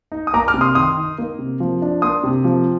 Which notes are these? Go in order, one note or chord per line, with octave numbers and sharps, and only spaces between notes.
D#4
D#6
A#3 A#5 D6
D6 F6
C3
C6 D#6
D#3 C6 D#6
D#4
A#3
C3
F3
D4
A#3 C6 D#6
C3
F3